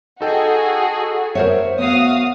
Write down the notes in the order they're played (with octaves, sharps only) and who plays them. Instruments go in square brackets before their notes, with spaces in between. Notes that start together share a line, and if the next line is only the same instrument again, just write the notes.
[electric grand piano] D#4 A4 G5 [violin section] F#4 G#4
[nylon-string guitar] A#4 C5 C#5 [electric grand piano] E5
[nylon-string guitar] B3 [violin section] F#4 F5 D#6